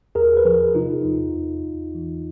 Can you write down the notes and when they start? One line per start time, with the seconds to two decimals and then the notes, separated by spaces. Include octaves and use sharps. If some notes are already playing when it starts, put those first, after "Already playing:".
0.15 E2 G#4 A#4
0.37 B4
0.45 F3 G#4 A#4
0.75 C3 D#4 F4
1.05 E2
1.35 E2
1.65 E2
1.95 E3